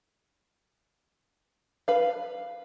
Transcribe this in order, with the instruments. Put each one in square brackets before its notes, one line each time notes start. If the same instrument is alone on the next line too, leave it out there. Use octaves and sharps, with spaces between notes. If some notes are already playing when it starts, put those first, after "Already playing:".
[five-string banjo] B4 F5